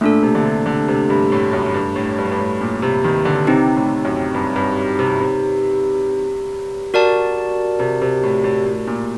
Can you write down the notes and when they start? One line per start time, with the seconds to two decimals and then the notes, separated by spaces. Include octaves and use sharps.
0.01 A#2 A3 D4 A4
0.23 C3
0.35 D3
0.45 C3
0.66 D3
0.88 C3
1.10 G2
1.32 A2
1.53 F#2
1.74 G2
1.96 A2
2.18 G2
2.25 A2
2.32 G2
2.39 A2
2.61 A#2
2.82 C3
3.04 D#3
3.25 D3
3.47 C3 C4 D#4 G4
3.76 A2
4.05 F#2
4.34 G2
4.56 G2
4.99 C3
5.21 C3
6.94 F#4 A#4 D5 A5
7.79 C3
8.02 C3
8.23 A2
8.44 A2
8.66 A2
8.87 A#2